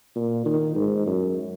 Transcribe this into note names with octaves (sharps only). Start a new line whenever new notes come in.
A#2
D#3
G#2
F#2